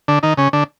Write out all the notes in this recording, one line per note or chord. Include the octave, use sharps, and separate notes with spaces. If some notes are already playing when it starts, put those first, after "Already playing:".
D3 D4
D#3 D#4
C#3 C#4
D3 D4